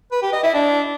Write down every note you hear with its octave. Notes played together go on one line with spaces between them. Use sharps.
B4
G4
D#5
E4
D4